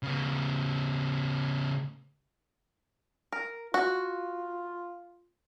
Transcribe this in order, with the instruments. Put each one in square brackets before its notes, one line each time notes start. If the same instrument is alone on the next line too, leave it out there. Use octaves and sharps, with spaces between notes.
[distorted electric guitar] C#3 B3
[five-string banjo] A#4
[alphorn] F4 [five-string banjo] F#4